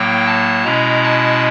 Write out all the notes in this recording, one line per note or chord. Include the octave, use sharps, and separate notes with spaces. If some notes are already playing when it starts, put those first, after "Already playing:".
Already playing: A2 F#3 A#3 G5
A5
B2 G#3 C#4 E4 A#5
A5